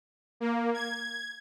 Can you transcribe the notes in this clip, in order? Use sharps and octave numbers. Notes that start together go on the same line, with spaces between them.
A#3
G#6